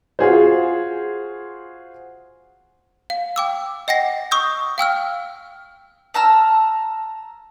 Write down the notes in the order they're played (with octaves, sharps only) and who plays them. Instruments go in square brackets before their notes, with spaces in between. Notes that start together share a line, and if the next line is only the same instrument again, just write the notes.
[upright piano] F4 F#4 G#4 C5
[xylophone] F5
G5 D6 E6
D#5 F#5 G5 A#6 C7
C#6 D#6 E6 G6
F5 G5 E6 F6
[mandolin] A5 A#5 E6 F6